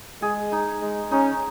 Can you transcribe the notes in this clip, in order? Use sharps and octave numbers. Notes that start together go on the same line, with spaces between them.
G#3 G#4
D#4
G#3
C#4 D#4